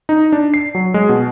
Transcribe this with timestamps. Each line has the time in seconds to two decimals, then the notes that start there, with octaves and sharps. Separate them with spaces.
0.09 D#4
0.32 D4
0.54 C7
0.75 F#3
0.94 G#3
1.09 B2